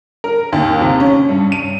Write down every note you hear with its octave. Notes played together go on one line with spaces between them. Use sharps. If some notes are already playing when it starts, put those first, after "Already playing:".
A#4
D#2
C3
C#4
G2
D#7